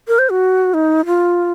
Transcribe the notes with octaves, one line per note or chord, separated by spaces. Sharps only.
A#4
C5
F#4
D#4
F4